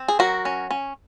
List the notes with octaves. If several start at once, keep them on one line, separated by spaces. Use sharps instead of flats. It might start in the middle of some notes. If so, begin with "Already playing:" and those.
Already playing: C4
G#4
F#3 F#4 A#4
C#4
C#4